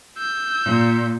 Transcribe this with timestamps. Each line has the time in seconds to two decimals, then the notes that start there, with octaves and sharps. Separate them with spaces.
0.18 E6 G6
0.65 A#2